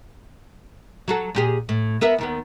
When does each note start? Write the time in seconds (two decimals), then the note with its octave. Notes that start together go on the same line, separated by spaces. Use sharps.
1.08 F#3 F#4 A4
1.35 A#2 G4 G#4
1.69 A2
2.01 B3 A#4 E5
2.18 D#2 D#3 B3